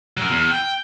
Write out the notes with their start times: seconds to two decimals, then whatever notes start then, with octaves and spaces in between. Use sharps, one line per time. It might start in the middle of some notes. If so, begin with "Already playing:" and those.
0.17 F#3 A#4
0.31 E2
0.51 G5